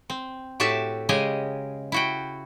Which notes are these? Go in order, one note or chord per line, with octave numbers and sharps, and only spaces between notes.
C4
A2 F#4 G4 E5 A5
C#3 G#3 G4 D#5 G#5
E4 F#4 G5